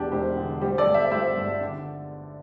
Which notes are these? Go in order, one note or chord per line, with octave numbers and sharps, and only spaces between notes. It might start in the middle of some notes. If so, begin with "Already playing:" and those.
Already playing: E1 E2 D4 G4
E1 G4 C5
D3
G3 G4 C5
A4 D5
G1
C5 E5
G3 C5 E5
G2
D3